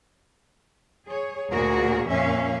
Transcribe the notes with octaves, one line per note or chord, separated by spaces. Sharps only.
G#4 C#5
D2 A#2 F#4 G#4 A#4
F2 A#2 A#3 C#4 E5 F5